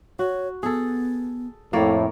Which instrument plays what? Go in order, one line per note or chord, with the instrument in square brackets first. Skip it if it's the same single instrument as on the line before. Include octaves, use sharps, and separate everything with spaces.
[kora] F#4 [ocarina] C#5
[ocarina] B3 [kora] G#4 A4
[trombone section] F2 A2 [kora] A#3 C#5 D5 [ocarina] E4